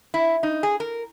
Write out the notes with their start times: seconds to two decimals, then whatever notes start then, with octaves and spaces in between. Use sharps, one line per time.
0.14 E4
0.43 D#4
0.63 G#4
0.80 A#4